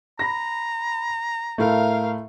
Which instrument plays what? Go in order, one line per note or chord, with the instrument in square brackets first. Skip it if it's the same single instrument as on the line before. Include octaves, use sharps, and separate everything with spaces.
[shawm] A#5 [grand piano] B5 A#6
[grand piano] A2 A3 [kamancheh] A#4 F5